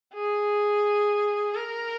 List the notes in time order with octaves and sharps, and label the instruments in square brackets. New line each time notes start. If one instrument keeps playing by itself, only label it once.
[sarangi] G#4
A#4